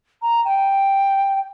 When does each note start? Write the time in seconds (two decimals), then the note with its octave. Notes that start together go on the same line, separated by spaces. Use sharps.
0.22 A#5
0.45 G5